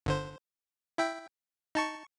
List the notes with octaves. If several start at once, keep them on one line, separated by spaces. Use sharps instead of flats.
G1 D3 C5
E4 E5 G5
D#4 A5 C#6